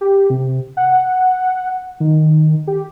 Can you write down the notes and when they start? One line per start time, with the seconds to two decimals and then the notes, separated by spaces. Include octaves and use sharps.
0.01 G4
0.30 C3
0.77 F#5
2.00 D#3
2.67 G4